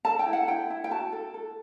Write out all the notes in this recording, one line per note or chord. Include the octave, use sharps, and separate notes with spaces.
A4 A5
G5
E4
F#5
E4 G5
E4
G5
F#4 A5
A4
A4